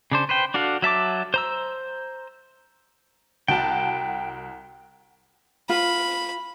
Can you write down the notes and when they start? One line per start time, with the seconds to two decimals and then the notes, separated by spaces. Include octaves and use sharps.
0.11 C#3 D4 C5
0.29 B4 C5 G5
0.54 D4 F#4 A4 F5
0.82 F#3 E5 A5 D6
1.34 C5 A#5 E6
3.48 C2 F#4 G5 A5
5.69 F4 B5